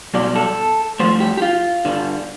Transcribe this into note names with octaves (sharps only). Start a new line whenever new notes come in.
B1 B2 G3 D5
A4
G2 F3 A3 C5
G4
G4
F4
G2 D3 G3